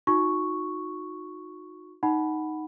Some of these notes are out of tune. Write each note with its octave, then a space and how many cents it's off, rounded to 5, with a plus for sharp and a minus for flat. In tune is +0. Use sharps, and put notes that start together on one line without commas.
D#4 +0 F#4 -35 C#6 +0
D#4 +0 F#5 +5 B5 +0